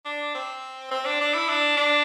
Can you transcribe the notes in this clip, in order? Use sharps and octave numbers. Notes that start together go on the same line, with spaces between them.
D4
C4
C4
D4
D4
E4
D4
D4